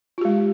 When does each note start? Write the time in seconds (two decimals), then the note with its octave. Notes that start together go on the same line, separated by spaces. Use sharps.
0.18 F4
0.21 G4
0.25 G#3